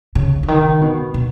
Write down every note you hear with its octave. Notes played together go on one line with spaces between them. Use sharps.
C#3
C#3
D#3
B2
B2